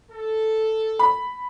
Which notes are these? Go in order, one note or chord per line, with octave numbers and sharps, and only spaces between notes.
A4
B5